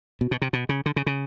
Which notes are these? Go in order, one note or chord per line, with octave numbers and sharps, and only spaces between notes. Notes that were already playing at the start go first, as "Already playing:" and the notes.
B2
B2
C3
B2
C#3
D3
C#3
C#3